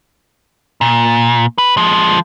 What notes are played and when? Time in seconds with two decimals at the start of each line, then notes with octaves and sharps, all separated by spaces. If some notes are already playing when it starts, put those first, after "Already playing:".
0.81 A#2
1.58 B4
1.77 F3 G#3